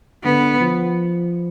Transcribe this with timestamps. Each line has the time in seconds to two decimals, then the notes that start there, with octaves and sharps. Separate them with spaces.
0.24 D3 B3
0.61 F3